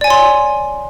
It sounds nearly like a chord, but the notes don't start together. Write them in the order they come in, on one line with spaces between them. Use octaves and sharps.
D5 G#5 C#5 C6